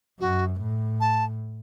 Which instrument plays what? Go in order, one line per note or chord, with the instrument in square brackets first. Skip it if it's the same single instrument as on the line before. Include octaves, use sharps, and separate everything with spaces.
[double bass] F#2 [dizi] F#4
[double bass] A2
[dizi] A5